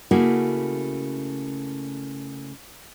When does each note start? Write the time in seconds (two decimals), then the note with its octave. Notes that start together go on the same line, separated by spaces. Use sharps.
0.11 C#3 A3 A#3 E4 F#4